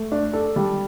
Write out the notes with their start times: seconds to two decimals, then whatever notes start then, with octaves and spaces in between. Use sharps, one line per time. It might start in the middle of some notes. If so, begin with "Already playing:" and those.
Already playing: A3
0.12 D4
0.33 A4
0.56 G3